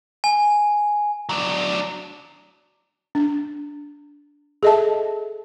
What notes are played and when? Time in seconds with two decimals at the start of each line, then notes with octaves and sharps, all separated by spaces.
0.24 G#5
1.29 F#3 D4
3.15 D4
4.63 G#4 A4 D#5 E5 A5